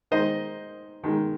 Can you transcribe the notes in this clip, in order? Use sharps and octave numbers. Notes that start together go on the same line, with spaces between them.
D#3 G#3 D#4 C5 D#5
D#3 G#3 D#4